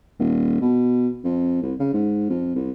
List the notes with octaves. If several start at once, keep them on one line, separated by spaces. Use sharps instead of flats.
D#1
B2
F2
C2
C#3
G#2
F2
C2